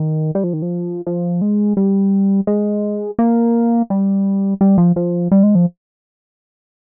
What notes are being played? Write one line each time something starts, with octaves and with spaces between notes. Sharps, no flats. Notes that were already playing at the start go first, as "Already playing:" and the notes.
Already playing: D#3
G3
F3
D#3
F3
F3
G#3
G3
G#3
A#3
G3
G3
F3
F3
G3
G#3
F3